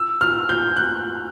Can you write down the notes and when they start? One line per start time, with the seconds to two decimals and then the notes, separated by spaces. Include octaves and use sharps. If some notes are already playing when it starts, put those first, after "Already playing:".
Already playing: E6
0.21 F6
0.49 G6
0.76 F#6